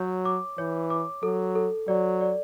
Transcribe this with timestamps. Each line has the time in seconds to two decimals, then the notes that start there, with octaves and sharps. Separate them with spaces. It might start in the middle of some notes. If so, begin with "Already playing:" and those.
Already playing: F#3 C#5
0.25 D6
0.58 E3 C#5
0.90 D6
1.23 F#3 A4
1.55 A4
1.88 F#3 D5
2.21 D5